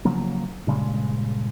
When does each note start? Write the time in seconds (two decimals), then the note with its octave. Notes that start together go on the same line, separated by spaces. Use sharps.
0.05 C#3 F3 F#3 A#3
0.67 G2 A#2 C#3 G#3